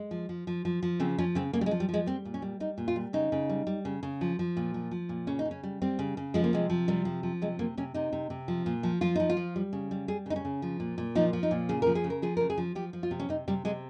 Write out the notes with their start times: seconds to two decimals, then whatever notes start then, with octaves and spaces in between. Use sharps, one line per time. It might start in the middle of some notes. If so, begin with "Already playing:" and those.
Already playing: G#3
0.11 F3
0.29 F3
0.47 F3
0.65 F3
0.83 F3
1.00 C#3 C4
1.18 F3 C#4
1.35 C#3 C4
1.53 C#3 A#3
1.61 G3
1.66 G#3
1.71 F3
1.80 G3
1.89 F3
1.94 G#3
2.06 G3 C4
2.25 A#2
2.34 C#4
2.42 G3
2.60 G3 D#4
2.78 A#2
2.88 F4
2.96 G3
3.13 C#3 D#4
3.32 C#3
3.49 G3
3.67 G3
3.85 C#3
4.03 C#3
4.21 F3
4.39 F3
4.57 A#2
4.74 F3
4.91 F3
5.09 A#2
5.27 C#3 C#4
5.39 D#4
5.45 C#3
5.51 C#4
5.63 G3
5.82 G3 C4
5.99 C#3
6.17 C#3
6.34 F3 G#3
6.44 A#3
6.53 C3 G#3
6.70 F3
6.88 C3 G3
7.05 F3
7.23 F3
7.42 C3 G#3
7.59 C3 A#3
7.77 C3 C#4
7.94 C3 D#4
8.13 C3
8.30 C3
8.48 F3
8.66 A#2
8.83 F3
9.01 F3 F4
9.16 F3 D#4
9.30 F4
9.37 F3
9.56 G3
9.73 C#3
9.91 G3
10.08 G3 G#4
10.26 C#3 D#4
10.36 C#4
10.45 C#3
10.62 F3
10.80 A#2
10.98 A#2
11.15 F3 D#4
11.33 F3
11.43 D#4
11.51 A#2
11.69 C#3 G#4
11.82 F3 A#4
11.95 G#4
12.04 C#3
12.10 A#4
12.22 F3 G#4
12.37 C#3 A#4
12.50 G#4
12.58 F3
12.75 F3 G4
12.93 F3
13.03 F4
13.11 C3
13.20 C#4
13.29 C3 D#4
13.48 C3 G3
13.65 C3 G#3